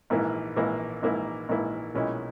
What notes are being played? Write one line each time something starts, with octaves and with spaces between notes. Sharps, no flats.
A#1 G#2 E3 A#3 E4
A#1 G#2 E3 A#3 E4
A#1 G#2 E3 A#3 E4
A#1 G#2 E3 A#3 E4
B1 A#2 G#3 C#4 E4